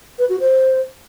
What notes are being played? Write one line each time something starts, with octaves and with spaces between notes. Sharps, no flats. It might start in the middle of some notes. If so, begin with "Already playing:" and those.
B4
F#4
C5